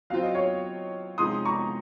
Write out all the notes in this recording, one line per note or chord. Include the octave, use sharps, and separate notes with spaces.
F#3 C4 F4 C5 F5
D#5
C#5 F5
C3 F3 G#3 D#4 G#4 C6 D#6
A#5 C#6